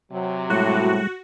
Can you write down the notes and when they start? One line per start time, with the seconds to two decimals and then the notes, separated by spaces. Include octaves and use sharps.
0.12 C3 F#3
0.50 A2 G3 G#3 F#4